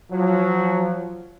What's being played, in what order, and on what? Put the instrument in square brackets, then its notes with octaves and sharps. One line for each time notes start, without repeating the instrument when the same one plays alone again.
[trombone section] F3 F#3